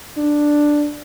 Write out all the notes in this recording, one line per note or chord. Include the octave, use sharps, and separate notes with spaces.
D4